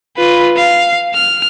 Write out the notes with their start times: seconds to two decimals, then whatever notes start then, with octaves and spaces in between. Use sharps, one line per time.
0.17 F4 B4
0.57 F5
1.14 F6